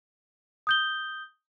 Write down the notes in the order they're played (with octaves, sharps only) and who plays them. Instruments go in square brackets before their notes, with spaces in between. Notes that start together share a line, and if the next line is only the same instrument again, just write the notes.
[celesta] D#6 G6 G7